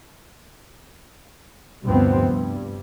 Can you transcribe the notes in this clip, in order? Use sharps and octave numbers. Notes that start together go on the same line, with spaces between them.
D2 G2 C3 F3 B3 C4
G2